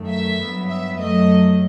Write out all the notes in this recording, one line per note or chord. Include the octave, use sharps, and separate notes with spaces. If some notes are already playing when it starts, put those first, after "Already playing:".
Already playing: F#2 D#3 A3
E5
G2 F#3 B3
E5
F#2 F#3 A3 D#5